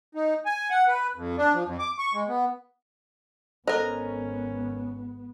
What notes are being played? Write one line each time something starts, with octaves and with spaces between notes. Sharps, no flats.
D#4
G#5
F#5
B4
F2
D4
F3
F2
D6
C#6
G#3
B3
G#1 B3 C#4 A4 A#4 C5 D#5